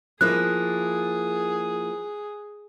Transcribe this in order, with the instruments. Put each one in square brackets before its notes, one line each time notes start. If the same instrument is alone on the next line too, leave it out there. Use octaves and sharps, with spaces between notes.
[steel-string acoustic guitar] F3 A#3 E4 [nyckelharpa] G#4 [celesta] F#6